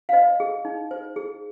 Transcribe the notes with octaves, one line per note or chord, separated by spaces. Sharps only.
F5
C5 D#5
G#4
D#4
C5
G#4